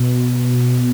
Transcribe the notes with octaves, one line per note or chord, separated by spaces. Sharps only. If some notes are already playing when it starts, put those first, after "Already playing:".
Already playing: B2